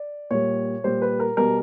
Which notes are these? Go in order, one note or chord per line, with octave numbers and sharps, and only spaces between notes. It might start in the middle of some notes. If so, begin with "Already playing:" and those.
Already playing: D5
A#2 G3 C#5
A#2 G3 C5
B4
A#4
B2 G3 A#4